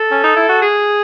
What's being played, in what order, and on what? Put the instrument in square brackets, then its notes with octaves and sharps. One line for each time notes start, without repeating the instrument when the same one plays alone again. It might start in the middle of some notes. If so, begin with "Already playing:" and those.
Already playing: [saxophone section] A4
C#4
D#4
E4
F#4
G#4